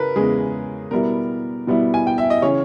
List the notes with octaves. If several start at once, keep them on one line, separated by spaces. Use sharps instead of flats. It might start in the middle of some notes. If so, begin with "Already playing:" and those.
Already playing: C#3 A#4 B4
E2 C#3 G#3 G#4
B2 G3 B3 E4 A#4
B2 G3 B3 E4
G#5
G5
E5
D#5
C#3 E3 C#4 C#5